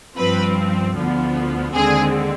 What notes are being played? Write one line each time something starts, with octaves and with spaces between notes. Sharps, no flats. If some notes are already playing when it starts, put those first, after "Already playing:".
G2 F3 C4 B4
D2 D3 F3 B3
D#2 D3 G#3 C4 G#4